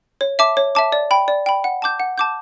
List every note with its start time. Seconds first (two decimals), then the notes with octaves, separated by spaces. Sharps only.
0.21 C#5
0.39 E5 A5 D6
0.57 C#5
0.75 E5 A5 D6
0.92 D5
1.11 G5 B5
1.28 D5
1.46 G5 B5
1.64 F#5
1.82 A5 D6 G6
2.00 F#5
2.18 A5 D6 G6